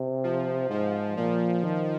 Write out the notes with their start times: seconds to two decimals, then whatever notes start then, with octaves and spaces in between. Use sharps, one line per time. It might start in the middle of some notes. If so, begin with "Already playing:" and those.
Already playing: C3
0.24 F3
0.70 G#2 F3
1.17 A#2 F3
1.64 D#3